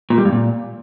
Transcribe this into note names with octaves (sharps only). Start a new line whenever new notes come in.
A#2
G3
G2
A#2